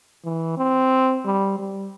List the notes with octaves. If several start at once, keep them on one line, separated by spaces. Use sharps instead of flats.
E3
C4
G3
G3